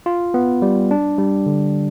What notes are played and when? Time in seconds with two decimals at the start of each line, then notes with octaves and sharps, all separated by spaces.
0.06 F4
0.34 B3
0.62 G3
0.91 D4
1.18 G3
1.46 D3